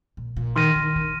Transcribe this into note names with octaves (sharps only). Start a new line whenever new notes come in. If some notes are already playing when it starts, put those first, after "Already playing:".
A#2
A#2
D#3 C6 F6 A#6 D#7
D#3
D#3